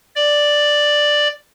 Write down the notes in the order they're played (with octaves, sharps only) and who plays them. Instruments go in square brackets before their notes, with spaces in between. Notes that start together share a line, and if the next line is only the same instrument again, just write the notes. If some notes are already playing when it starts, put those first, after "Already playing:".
[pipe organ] D5